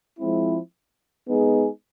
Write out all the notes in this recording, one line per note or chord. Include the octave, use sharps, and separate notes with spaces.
F3 G#3 C4 E4
G#3 B3 D#4 G#4